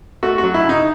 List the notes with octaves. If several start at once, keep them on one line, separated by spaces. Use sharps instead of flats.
A3 F#4
F#4
F#3
E4
C#3
D#4